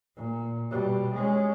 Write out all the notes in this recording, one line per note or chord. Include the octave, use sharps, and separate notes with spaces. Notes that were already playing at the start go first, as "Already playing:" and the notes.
A#2
B2 G3
G#3 C#4